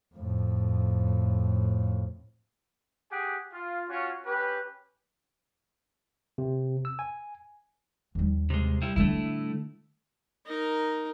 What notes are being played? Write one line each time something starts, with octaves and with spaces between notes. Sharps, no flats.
F2 A2
G4 G#4 F#5 G#5
F4
C#4 F4 F#4 C#5
C#4 G4 B4
C3
E6
G#5
D#2 G3
C3 G#3
G3 E4
D3 G3 A3 E4
D#4 A#4